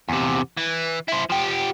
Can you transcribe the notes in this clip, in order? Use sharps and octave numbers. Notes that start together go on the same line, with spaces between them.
E2 C3
E3
E4 C5
F3 G4